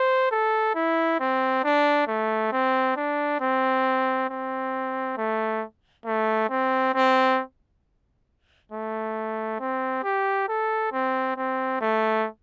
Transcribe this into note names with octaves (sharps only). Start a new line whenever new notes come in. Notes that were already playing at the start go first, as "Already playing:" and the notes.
Already playing: C5
A4
E4
C4
D4
A3
C4
D4
C4
C4
A3
A3
C4
C4
A3
C4
G4
A4
C4
C4
A3